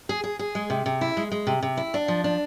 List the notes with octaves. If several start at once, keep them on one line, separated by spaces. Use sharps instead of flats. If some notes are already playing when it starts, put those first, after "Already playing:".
G#4
G#4
G#4
G#3
C3
C3
E4
G#3
G#3
C3
C3
E4
D4
F3
D4